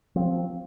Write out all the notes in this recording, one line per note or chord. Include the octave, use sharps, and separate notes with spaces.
F3 C4